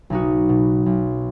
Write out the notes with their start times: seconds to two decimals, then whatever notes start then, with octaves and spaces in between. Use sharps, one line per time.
0.10 B1 D#4 F#4
0.49 B2
0.86 B1